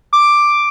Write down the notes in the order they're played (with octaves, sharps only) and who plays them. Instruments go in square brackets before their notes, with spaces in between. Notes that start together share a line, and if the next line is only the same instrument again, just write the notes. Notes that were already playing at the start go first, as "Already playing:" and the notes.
[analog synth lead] D6